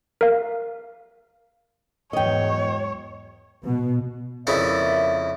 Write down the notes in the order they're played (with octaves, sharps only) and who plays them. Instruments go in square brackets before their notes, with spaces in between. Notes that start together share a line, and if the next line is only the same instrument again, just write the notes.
[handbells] A#4 F5
[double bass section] E2 G#2 F#3 [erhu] C#5 [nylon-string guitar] D#5 G5
[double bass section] B2
[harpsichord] F2 C#3 E4 [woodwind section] A#3 D5 E5